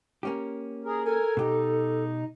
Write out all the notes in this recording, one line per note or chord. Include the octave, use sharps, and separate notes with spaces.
A#3 C#4 G4
G#4 A#4
A4 A#4 G#5
B2 D#4 G4